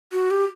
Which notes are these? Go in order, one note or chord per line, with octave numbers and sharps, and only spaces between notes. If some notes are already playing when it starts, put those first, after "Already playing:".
F#4
G4